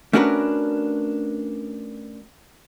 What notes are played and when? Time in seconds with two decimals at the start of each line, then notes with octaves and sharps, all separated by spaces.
0.13 A3 C#4 D4 F#4 A#4 B4